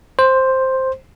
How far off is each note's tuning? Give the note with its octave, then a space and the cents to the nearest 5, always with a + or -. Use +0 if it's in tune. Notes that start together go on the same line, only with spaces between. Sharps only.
C5 +5